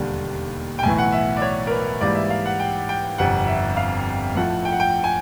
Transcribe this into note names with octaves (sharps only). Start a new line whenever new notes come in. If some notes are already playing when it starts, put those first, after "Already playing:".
Already playing: E1 D#2 D3 G3
G5
B1 A2 E3 G#5
F#5
E5
D5
C#5
A#4
B4
G#2 E3 G3 A#3 D5
E5
F5
F#5
G5
G5
G1 F2 C3 F#5
E5
F5
A2 F3 A3 F#5
G5
F#5
G5
G#5